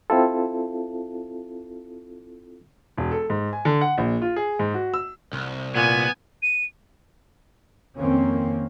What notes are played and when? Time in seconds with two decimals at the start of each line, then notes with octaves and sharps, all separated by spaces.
0.10 C4 E4 F4 A4
2.98 E1
3.11 A4
3.30 G#2
3.53 G#5
3.65 D3
3.81 F#5
3.98 A#1
4.22 F4
4.36 G#4
4.59 G#2
4.74 F#4
4.94 E6
5.33 C2
5.76 A#2 B3 G#5
6.43 D#7
7.98 F2 D#3 A#3 C4 C#4